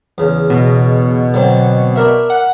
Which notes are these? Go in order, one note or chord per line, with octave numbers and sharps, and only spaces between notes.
E2 C#3
B2
D3 F#3 C4
D4 A#4 E5
F#5